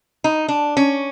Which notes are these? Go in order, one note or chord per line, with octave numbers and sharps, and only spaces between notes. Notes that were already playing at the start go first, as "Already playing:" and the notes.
D#4
D4
C#4